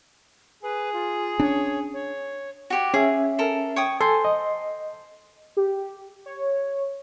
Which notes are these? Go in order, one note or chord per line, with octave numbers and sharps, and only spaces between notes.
G#4 B4
F4
C#4 D4 C#5
C#5
F#4 G4 C#5
C#4 G#4 E5
A4 A#4
C#5 G5 D#6
A4 C5 G#5
D#5
G4
C#5